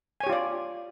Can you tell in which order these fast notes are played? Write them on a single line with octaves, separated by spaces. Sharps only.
G#5 C#5 G4 F4 D5